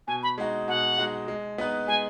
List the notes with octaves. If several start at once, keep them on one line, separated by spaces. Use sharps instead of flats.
B2 G#5
B5
G#3 D#4 F#4
B2 F#5
G#3 D#4 F#4
G#3
B3 D#4 B4
G#3 G#5